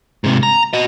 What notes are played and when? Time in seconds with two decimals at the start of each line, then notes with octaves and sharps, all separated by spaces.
0.24 G#2 C3
0.43 A#5
0.73 F#4 D#5